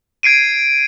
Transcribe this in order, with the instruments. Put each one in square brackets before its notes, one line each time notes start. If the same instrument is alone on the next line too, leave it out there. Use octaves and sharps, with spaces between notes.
[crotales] G#6 C7 D7 D#7